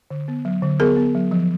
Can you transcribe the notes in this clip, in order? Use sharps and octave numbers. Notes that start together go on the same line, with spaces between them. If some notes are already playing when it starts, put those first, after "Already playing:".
D3
B3
F#3
D3
B3 G#4 A#4
B3
F#3
F3